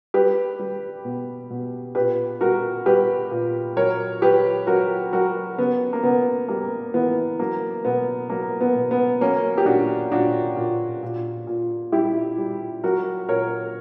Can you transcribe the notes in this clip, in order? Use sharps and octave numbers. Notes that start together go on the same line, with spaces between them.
G3 G4 B4
G3
B2
B2
A#2 G4 B4
G3 F#4 A#4
G3 G4 B4
A#2
F#3 A#4 C#5
F#3 G4 B4
F#3 F#4 A#4
F#3 F#4 A#4
C#3 B3
A#3
C#3 B3
G3 A#3
E3 B3
F#3 A#3
B2 B3
F#3 A#3
B3
B2
B3
F#3 A#3 C#4
G4
A#2 D4 F#4
A#2 D4 F#4
A#2
A#2
A#2
G3 E4 G4
G3
F#3 F#4 A#4
A#2 A#4 C#5